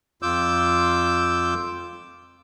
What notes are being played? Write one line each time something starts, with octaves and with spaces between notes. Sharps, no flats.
F2 F4 D6 E6 G6